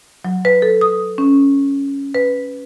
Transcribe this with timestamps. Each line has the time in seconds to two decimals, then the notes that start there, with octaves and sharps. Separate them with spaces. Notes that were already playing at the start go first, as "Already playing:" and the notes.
0.25 F#3
0.45 B4
0.62 A4
0.81 D#6
1.18 C#4
2.15 B4